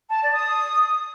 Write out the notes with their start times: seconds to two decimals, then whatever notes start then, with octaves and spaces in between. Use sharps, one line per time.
0.10 A5
0.22 D5
0.34 D#6